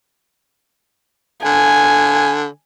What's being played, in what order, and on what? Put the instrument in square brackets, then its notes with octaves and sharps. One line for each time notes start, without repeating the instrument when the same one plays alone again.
[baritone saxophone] D3 [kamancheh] G#5